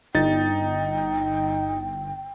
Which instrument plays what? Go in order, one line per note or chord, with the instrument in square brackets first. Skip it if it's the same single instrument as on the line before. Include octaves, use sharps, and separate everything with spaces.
[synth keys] G1 [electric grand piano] D#4 A6 [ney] G5